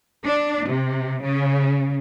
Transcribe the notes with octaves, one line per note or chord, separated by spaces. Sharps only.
D4
C3
C#3